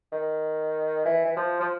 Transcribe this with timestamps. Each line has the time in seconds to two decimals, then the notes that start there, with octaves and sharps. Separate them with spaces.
0.12 D#3
1.05 E3
1.25 E3
1.36 F3
1.60 F3